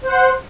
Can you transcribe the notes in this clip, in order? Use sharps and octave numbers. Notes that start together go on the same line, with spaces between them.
C5 F#5 C6